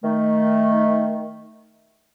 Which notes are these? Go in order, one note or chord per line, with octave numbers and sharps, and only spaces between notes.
D#3 A3